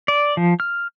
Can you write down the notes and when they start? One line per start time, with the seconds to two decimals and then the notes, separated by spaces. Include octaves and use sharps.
0.08 D5
0.37 F3
0.60 F6